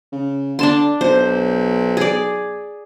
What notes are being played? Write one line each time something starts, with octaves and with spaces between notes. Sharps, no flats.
C#3
D3 D4 A5 C6
B1 C5
G#4 D5